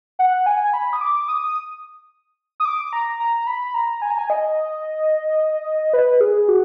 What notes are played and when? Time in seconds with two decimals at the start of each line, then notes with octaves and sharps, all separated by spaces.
0.19 F#5
0.46 G#5
0.74 B5
0.93 D#6
1.01 D6
1.28 D#6
2.60 D#6
2.65 D6
2.93 A#5
3.20 A#5
3.47 B5
3.74 A#5
4.02 G#5
4.10 A#5
4.18 G#5
4.30 D#5
5.94 B4
6.21 G#4
6.48 F#4